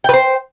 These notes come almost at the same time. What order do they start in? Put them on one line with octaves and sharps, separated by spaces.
G5 B4 C5